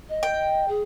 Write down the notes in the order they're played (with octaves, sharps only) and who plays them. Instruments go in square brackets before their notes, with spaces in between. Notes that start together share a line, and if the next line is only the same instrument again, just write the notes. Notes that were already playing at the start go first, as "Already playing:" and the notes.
[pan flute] D#5
[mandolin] G5
[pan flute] G#4